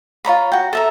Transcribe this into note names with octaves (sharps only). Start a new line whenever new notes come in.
F4 C#5 A#5 B5
F#4 G5
A4 E5 A#5